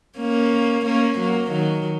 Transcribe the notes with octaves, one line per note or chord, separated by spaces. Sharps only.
A#3 C#4
A#3 C#4
F#3 A#3
D#3 F#3